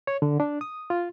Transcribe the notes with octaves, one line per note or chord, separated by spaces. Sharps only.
C#5
D3
D4
D#6
F4